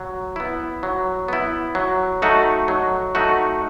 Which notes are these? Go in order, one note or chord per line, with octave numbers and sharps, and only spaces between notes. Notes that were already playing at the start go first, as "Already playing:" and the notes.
Already playing: F#3
B3 E4
F#3
B3 E4
F#3
A3 D#4 F#4
F#3
A3 D#4 F#4